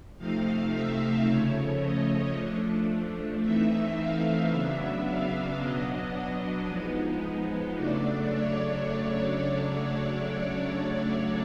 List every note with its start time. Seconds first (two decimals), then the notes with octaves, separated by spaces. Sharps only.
0.18 C3 F3 A3 C4 D#4 F5
0.71 E5
1.26 C#3 F3 A3 C#5
1.81 D#5
2.34 F3 A3 D4
3.42 E3 A3 C4 D#4 E5
3.96 F5
4.51 C#3 F#3 B3 D4 E5
5.05 F5
5.58 B2 F#3 B3 D4 D#5
6.13 D#5
6.67 F3 G#3 B3 D#4
7.75 C#3 F#3 A3 D4 D5
8.29 C#5